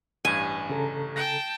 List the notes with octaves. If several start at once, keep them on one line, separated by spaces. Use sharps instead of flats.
A1 G2 G#5
C#3 A4 A#5
G5 A5 A#6